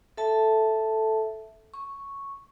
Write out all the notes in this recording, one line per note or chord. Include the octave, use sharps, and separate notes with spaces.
A4 E5 A5
C#6